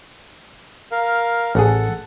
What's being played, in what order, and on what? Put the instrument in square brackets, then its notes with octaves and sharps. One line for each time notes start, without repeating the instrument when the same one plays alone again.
[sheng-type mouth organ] A#4 F5
[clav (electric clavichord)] A1 G#4 [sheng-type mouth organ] A4 F#5